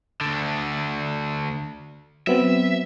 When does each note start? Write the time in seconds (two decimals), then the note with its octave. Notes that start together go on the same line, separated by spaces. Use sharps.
0.21 D2 D3
2.27 F#3 B3 C4 E5